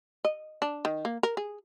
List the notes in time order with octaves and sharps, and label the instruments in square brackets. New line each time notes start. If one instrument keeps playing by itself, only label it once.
[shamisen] D#5
D4
D#3
A#3
A#4
G#4